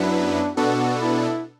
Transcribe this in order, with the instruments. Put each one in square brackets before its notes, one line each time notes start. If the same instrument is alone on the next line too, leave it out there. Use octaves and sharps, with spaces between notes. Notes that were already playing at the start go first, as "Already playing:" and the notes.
Already playing: [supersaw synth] F#2 F#3 B3 E4 B4 [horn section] D4
[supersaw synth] B2 B3 D4 A4 [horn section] F#4
[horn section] E4